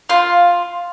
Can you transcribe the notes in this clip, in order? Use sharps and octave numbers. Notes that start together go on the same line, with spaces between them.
F4